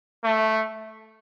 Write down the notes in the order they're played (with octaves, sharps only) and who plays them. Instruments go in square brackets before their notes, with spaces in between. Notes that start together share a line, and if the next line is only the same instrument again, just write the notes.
[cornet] A3